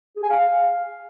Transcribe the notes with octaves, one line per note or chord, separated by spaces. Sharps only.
G#4
G#5
F5